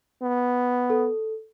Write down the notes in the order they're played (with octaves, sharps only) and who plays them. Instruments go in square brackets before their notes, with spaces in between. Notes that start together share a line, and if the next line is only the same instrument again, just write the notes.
[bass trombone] B3
[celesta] A4